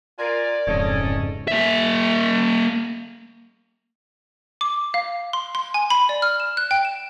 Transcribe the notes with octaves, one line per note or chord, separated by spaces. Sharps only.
F4 A#4 D5 G#5
D1 F2 G#2 C#3 C#4 A4 D#5
A#3 E5
D6
F5
C6
C6
G#5
B5
D5
F6
E7
F#6
G5
E7